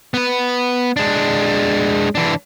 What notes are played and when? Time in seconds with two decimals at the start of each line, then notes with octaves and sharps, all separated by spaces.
0.14 B3 B4
0.96 G#3 D4
2.15 E3 D4